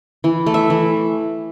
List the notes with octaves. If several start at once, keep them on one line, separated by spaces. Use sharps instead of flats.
E3
A3
E5
E3